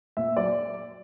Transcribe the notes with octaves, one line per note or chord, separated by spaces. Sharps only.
A#2 E5
F#3 D5